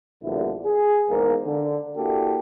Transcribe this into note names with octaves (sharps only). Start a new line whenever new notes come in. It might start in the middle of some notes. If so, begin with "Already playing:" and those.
A#1 E2 G2 B2 D3 E4
G#4
E2 G#2 A#3
D3
A#3 D4 E4 F#4 G4 A4